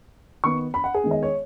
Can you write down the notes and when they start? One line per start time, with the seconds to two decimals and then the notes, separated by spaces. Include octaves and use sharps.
0.44 D#3 B3 C#6
0.74 B5
0.84 F#5
0.94 G#4
1.04 D#3 G#3 B3
1.11 D#5
1.23 C#5